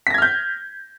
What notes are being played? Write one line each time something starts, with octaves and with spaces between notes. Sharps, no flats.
F6 G6 G#6 A#6 B6